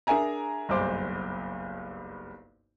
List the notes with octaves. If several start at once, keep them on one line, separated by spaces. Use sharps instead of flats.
D4 G#4 A#4 E5 G#5 A#5
F#1 B1 G2 C5 D6